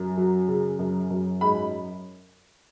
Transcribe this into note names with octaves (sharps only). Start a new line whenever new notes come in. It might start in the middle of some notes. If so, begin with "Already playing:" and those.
Already playing: F#2
F#3
C#3
F#2
F#2
G#2 B5